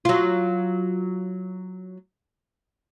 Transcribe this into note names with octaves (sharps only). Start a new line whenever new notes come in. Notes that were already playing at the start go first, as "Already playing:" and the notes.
F#3 F4